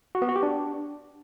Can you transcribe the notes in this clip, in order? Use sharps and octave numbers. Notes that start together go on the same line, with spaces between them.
F#4
B3
F#4
G4
D4